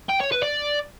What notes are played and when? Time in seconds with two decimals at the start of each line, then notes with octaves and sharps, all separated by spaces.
0.09 G5
0.20 C#5
0.32 B4
0.43 D5